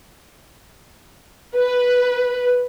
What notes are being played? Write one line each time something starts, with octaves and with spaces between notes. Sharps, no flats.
B4